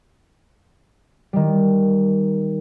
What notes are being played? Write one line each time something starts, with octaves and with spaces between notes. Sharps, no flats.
D#3 G3